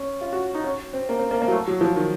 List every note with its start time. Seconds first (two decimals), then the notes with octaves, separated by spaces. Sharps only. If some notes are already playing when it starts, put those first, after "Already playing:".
Already playing: C#4
0.21 F4
0.33 F#4
0.54 D#4
0.64 C#4
0.93 C4
1.09 A#3
1.19 C4
1.31 A#3
1.42 A#3
1.48 F#3
1.52 A3
1.68 F#3
1.81 F3
1.96 D#3